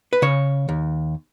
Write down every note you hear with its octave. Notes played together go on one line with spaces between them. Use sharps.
B4
C#3 C#5
D#2